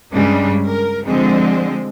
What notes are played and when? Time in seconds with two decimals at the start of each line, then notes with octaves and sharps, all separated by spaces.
0.14 G2 C#3 G3 G#3 D4
0.66 A#4
1.06 D3 F3 G#3 C4